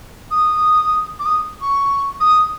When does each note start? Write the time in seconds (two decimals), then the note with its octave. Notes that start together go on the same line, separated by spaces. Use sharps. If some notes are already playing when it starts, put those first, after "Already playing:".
0.30 D#6
1.19 D6
1.25 D#6
1.61 C#6
2.20 D#6